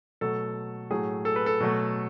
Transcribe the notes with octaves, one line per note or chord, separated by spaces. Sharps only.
B2 F#3 A3 A4
A2 F#3 A3 G#4
A4
B4
A4
B2 F#3 A3